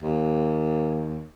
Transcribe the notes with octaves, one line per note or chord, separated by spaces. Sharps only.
D#2